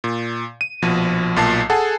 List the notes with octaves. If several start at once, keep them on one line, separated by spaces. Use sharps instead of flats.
A#2
D#7
A#1 B2 F3
B1 A#2 A5 C7
G#4 A4 F#5 G#5 A5